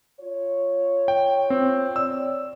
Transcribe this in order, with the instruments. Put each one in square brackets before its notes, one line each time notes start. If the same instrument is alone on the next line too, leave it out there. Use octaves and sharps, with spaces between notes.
[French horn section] F4 C#5
[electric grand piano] G5
C4
[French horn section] C#5 D5 [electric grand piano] E6